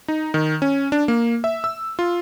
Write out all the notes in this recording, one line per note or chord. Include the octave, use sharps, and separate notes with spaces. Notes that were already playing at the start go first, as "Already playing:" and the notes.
D#4
D#3
C#4
D4
A#3
E5
E6
F4